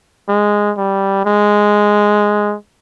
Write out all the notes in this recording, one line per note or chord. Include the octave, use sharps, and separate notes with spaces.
G#3
G3
G#3